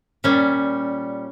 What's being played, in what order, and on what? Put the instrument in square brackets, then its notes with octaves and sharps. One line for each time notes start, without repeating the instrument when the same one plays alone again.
[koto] A#2 G3 C#4